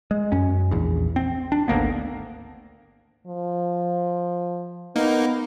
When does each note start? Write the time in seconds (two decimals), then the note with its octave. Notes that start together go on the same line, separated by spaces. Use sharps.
0.11 G#3
0.32 F#2 C#4
0.71 A#1 E2
1.16 C4
1.52 D4
1.68 G#1 D2 A#3 B3
3.27 F3
4.96 A#3 B3 D#4